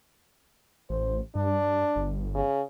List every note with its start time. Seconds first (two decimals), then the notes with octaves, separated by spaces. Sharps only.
0.90 A1 C5
1.35 G2 D4
1.96 G1
2.34 C#3